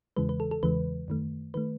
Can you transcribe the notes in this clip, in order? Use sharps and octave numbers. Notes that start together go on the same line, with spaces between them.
E2 C#3 E3 G#3 B4
B4
A4
A4
E2 C#3 E3 G#3 B4
F#2 D#3 A3
D#3 A3 B4